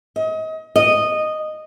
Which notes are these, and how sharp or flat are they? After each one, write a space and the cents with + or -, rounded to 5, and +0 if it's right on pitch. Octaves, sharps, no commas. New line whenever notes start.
D#5 +30
D#5 -10